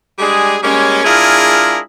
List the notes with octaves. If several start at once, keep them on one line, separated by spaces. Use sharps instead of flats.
G3 G#3 D4 G#4
G3 G#3 A#3 C#4
G#3 D4 E4 F4 G#4 A#4